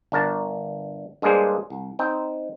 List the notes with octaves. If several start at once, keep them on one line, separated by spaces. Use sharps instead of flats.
G1 D4 A#4 A5
G2 G#3 A#3 D4 G#4 C5
C2
C4 D#4 G5